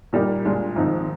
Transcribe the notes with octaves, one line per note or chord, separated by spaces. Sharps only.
A#2 G3 A#3 D#4 G4
A#2 G#3 D4 F4 G#4
G#1 G#2 F3 C4 D#4